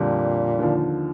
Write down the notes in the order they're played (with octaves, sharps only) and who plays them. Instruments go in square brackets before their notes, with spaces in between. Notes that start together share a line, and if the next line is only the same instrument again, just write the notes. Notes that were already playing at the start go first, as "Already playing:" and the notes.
Already playing: [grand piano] F2 D3 G3 [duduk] A#2
[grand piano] D#2 D3 F3